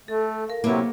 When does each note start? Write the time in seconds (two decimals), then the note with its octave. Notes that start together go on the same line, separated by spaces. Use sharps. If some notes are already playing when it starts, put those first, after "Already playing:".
0.08 A3 A4
0.48 A#4 F5
0.64 C3 F#3 A#3 B3 E4